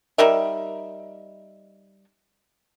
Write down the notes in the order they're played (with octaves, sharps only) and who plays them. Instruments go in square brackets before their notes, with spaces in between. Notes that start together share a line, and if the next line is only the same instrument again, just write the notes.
[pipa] G3 D#4 A#4 E5